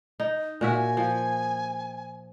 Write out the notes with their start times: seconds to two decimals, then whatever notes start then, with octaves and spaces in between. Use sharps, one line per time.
0.20 D#4
0.61 A#2 F#4 E5 G#5
0.97 F3